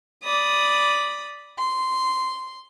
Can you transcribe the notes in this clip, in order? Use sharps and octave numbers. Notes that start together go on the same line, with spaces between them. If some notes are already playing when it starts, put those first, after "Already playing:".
D5 B5 D#6
C6